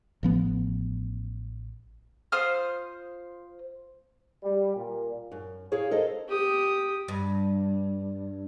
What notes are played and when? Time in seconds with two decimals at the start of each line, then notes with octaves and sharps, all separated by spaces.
0.23 A1 F3 B3
2.32 F4 C5 D#6 F6
4.43 G3
4.75 A#2
5.32 F#2
5.72 E4 G#4 C#5 F5
5.91 A4 A#4 C5 D#5
6.28 G4 D#6
7.08 G2